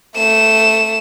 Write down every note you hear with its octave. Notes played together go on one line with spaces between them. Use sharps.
A3 E7